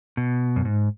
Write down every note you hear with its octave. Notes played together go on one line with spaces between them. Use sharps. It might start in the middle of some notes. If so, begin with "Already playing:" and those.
B2
F#2
G#2